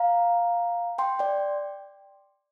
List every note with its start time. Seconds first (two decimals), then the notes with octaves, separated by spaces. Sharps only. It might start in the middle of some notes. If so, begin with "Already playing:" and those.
Already playing: F5 A#5
0.98 G5 C6
1.19 D5 G5